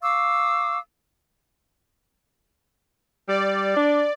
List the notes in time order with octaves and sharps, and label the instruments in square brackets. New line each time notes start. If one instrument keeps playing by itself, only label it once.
[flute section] F5 C#6 D6 E6
[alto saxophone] G3 [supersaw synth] D5
[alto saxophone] D4